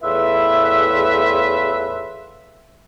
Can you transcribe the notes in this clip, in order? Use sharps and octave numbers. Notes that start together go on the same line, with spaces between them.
E2 A2 F4 B4 E5